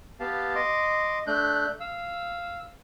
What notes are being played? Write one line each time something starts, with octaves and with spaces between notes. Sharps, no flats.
B3 G4 F5 A5
D#5 C6 D6
A3 D4 F#6 G6
F5 E6